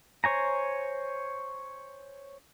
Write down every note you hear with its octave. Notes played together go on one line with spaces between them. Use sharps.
C5 C#5 G#5 A#5